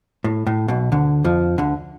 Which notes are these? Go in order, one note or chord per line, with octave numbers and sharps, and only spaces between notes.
A2
A2
B1 B2
D2 D3
F2 F3
D2 D3